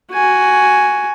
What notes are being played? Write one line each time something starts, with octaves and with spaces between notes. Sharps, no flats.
F#4 G#5